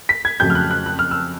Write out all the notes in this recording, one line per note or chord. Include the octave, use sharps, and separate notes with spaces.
B6
G#6
F2 C#3 F#3 A3 G6
F6
F#6
F#6
F#6
F6
E6